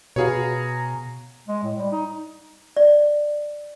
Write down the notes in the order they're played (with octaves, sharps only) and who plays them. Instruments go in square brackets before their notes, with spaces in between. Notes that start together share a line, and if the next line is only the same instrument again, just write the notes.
[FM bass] B2 [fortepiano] B3 F#4 F5 [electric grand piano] G#4 C#5 [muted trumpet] A#5
[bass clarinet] G#3
A2
G3
D#4
[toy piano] D5